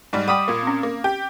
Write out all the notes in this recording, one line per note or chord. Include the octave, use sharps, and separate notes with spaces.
G#2 G3
G3 F#5 G5 B5 D6 D#6
A#2 A#3
C4 C#4
A#3
G4